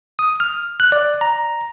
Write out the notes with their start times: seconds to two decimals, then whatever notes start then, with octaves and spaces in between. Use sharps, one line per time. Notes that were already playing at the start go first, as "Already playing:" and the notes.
0.19 D#6
0.40 F6
0.80 F#6
0.92 D5
1.21 A#5